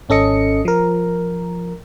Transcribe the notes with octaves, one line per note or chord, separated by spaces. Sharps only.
G#1 C#4 A4 D#5 C#7
F3 A#4